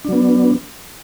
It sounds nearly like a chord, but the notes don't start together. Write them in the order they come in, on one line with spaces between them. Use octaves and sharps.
D4 F#3 B3